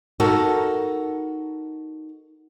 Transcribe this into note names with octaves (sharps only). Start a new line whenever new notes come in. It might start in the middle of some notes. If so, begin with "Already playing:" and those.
D#4 F#4 A4 A#4